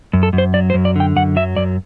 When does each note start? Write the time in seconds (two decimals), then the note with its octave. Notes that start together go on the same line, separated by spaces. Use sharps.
0.13 F#2
0.23 A4
0.33 F#2
0.38 C5
0.54 F#3 D5
0.70 C5
0.74 F#2
0.85 D5
0.96 D3 G5
1.16 F#2 F#5
1.36 F#3 E5
1.56 F#2 D5